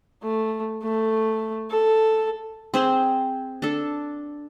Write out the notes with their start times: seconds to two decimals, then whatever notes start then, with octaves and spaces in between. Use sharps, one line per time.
0.23 A3
0.83 A3
1.70 A4
2.74 C4 G#4 C5 C6
3.62 D4 A4